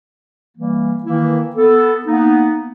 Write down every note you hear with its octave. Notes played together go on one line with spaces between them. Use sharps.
E3 G3 A#3
D#3 E3 A#3 E4
B3 A4
A#3 B3 D#4